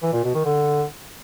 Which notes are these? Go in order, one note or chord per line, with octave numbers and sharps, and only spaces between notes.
E3
A#2
B2
D#3
D3